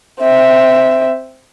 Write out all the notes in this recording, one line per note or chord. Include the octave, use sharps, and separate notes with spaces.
C4 E5